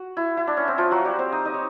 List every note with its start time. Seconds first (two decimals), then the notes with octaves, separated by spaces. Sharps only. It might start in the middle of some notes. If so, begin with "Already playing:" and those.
Already playing: F#4
0.17 E4
0.37 E4
0.47 D4
0.57 C#4
0.68 C4
0.78 F3 F4
0.91 F#3 F#4
1.05 G3 G4
1.19 C4 C5
1.32 D#4 D#5
1.45 D#4 D#5
1.54 C#5